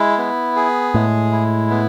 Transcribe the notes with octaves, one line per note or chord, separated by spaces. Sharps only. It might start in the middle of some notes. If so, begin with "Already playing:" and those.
Already playing: G#3 E4
B3
G#4
A2 G#3
E4
B3